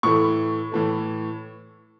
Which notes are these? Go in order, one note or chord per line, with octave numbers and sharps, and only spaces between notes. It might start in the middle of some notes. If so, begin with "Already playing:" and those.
A2 E3 A3 C#6
A2 E3 A3